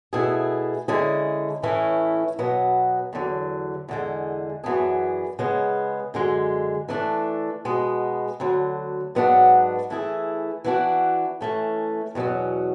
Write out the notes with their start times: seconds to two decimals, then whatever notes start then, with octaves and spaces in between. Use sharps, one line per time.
0.13 B2 A3 E4 G#4
0.88 D3 G#3 C#4 E4 G#4
1.62 A2 E3 A3 C#4 E4
2.39 B2 F#3 B3
3.13 E2 D3 F#3
3.88 E2 D3 G#3
4.64 F#2 E3 B3 D4 G#4
5.39 C#3 G#3 B3
6.14 F#2 D3 G#3
6.89 E3 A3 D4
7.65 B2 G#3 B3
8.40 D2 D3 F#3
9.15 G#2 F#3 B3 D4 F#4
9.90 E3 A3 E4 G#4
10.64 E3 B3 D4 F#4
11.41 E3 A3 C#4
12.15 E2 B2 F#3 C#4